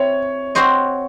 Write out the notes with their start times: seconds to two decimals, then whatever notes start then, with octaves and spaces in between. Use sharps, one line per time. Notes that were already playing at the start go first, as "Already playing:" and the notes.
Already playing: C4 E4 C#5
0.55 C4 F#4 C5 D#5